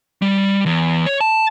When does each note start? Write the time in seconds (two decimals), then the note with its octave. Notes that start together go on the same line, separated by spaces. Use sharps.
0.22 G3
0.66 E2
1.06 C#5
1.21 A5